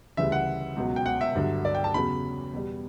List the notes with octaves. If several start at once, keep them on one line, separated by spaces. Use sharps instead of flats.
D2 C#3 E3 G3 E5
F#5
C#2 B2 F#3
G5
F#5
E5
G2 D3 F#3
D5
G5
A5
E2 C#3 F#3 B5
E2 B2 G3